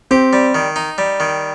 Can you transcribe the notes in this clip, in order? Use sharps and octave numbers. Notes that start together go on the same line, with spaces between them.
C4 G4
G3
D#3
D#4
G3
D#3